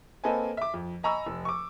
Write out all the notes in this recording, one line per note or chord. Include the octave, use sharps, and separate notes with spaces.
A#3 C4 A4 B4 D#5 G#5
E5 D6
F2
D#5 G#5 A#5 B5 C#6 E6
F1
C#6 D6